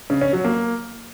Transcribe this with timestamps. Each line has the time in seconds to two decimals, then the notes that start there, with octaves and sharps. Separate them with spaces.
0.10 C#3
0.21 C#4
0.33 F#3
0.45 A#3